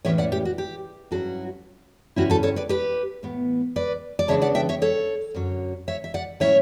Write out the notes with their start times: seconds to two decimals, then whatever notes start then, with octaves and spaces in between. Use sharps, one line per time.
0.05 A2 E3 G3 C#4 C#5 E5
0.18 D5 F#5
0.32 G4
0.45 F#4
0.58 G4
1.11 G2 F#3 C#4 E4 F#4 A4
2.16 G2 D3 G3 C#4 E4 F#4
2.30 F#4 A4
2.43 A4 C#5
2.56 B4 D5
2.69 G4 B4
3.23 A2 E3 B3
3.76 B4 D5
4.19 D5
4.28 C#3 E3 B3 D4 C#5 E5
4.42 D5 F#5
4.55 E5 G5
4.69 C#5 E5
4.82 A4 C#5
5.34 F#2 D3 F#3 C#4
5.88 C#5 E5
6.04 E5
6.14 D5 F#5
6.40 A2 F#3 C#4 E4 C#5 E5